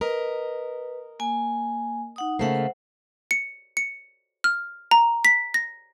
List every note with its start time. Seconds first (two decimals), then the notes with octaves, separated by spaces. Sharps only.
0.01 A#4 B4 D#5
1.20 A#3 G#5
2.16 D#4 F#5 D#6
2.39 C#3 A3 A#3 C5 F#5
3.31 C#7
3.77 C#7
4.44 F6
4.91 A#5
5.25 B6
5.54 A#6